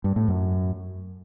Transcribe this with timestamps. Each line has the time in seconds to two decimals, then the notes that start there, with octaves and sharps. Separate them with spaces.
0.04 G2
0.16 A2
0.28 F#2